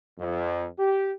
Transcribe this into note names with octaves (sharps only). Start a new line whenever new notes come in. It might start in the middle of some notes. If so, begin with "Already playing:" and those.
F2
G4